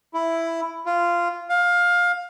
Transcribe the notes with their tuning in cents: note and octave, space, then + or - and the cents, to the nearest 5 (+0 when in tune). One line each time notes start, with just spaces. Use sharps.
E4 +5
F4 -10
F5 +20